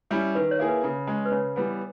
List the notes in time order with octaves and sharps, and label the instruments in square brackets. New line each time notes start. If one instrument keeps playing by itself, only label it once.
[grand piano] G3 C#4 E4
[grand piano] D#3 [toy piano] B4
[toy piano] C#5
[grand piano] A#3 E4 G#4
[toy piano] B4
[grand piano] C#3
G#3 C#4
[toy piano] B4
[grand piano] C#3 [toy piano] C#5
[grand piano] E3 G3 B3